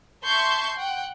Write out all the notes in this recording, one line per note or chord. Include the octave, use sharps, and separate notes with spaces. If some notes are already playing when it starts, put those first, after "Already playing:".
E5 A5 C6 C#6 G6
F#5 G5